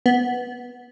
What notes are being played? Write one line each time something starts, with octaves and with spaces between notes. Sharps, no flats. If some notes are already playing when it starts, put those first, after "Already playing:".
B3